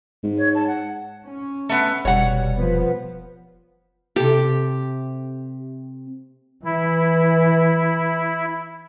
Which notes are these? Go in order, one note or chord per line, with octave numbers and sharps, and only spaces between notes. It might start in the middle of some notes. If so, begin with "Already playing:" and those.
G#2
C#5
A5
F#5
C#4
A3 B3
F1 B2 G3 C#5 F#5
F3 B3
C3 G4 A4
E3 E4